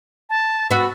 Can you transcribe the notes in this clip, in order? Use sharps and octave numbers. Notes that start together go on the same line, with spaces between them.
A5
B3 F#4 E6